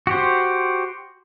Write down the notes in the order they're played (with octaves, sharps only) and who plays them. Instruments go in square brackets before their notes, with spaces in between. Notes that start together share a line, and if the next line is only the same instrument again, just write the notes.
[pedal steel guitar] F#4 G4 C5